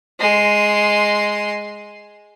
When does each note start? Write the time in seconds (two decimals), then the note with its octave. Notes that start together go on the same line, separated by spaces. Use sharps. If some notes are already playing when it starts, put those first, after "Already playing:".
0.20 G#3 C6